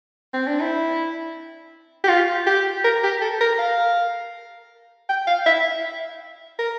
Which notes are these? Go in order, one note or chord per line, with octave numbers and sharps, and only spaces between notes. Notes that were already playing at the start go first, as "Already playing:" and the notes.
C4
D4
E4
G4
F4
G4
A#4
G4
A4
A#4
F5
G5
F5
E5
A#4